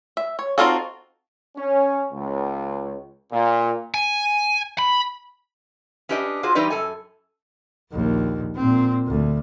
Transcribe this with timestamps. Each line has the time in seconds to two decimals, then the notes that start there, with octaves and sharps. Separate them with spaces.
0.17 E5
0.39 C#5
0.58 C4 D#4 F4 F#4 A4
1.55 C#4
2.11 C#2
3.31 A#2
3.94 G#5
4.79 B5
6.09 C#4 D4 G4 B4 C#5 D#5
6.43 F4 F#4 G#4 C5
6.55 E3 G3 D#4 B4 D5
6.70 F#2 A4 G#5
7.92 A#1 D#2
8.56 A#2 C4
9.07 D2